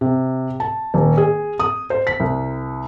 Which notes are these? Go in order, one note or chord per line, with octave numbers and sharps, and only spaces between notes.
C3
A5
D#1
G#4
D#6
C5
B6
C2